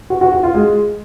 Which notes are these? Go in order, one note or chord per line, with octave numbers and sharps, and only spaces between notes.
F#4
F#4
F#4
F4
G#3